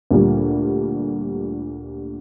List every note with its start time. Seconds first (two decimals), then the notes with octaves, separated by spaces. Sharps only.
0.11 D2 A#2 G3